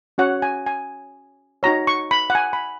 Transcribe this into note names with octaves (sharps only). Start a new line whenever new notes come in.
C#4 F#4 C#5 F#5
G#5
G#5
D#4 F#4 C#5 A#5
C#6
B5
F#5
G#5
B5